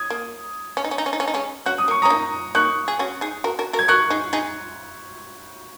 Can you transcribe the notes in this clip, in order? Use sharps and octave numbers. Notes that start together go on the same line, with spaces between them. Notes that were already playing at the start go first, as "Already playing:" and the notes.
Already playing: D#6 G#6
A#3
C#4
D#4
C#4
D#4
C#4
D#4
C#4
D#4
G#3 C#4
C#4 F#4 F#6
D#6
A#3
C#6
C#4 A#5 D#6
A#3 D#4
A#3 D#4 C#6 F#6
G#4
C#4 F#4
D#4 G#4
F#4 A#4
F#4 A#4
F#4 A#4
G#6
F#4 A#4 C#6 F#6
D#4 G#4
D#4 G#4